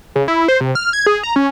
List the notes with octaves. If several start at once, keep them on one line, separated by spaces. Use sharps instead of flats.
C#3
E4
C5
C3
F6
G#6
G#4
A#5
C#4